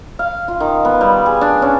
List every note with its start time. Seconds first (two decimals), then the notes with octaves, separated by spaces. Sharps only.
0.19 F5
0.48 F4
0.60 D#3
0.85 B3
1.01 G3
1.26 G#4
1.41 D4
1.62 C#4